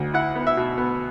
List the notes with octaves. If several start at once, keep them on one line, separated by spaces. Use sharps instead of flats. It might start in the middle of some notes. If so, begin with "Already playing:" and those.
Already playing: D2
E4 F#5
B3
E5
B2
B3